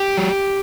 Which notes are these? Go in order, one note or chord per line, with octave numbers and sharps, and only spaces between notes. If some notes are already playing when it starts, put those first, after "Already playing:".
Already playing: G4
F#3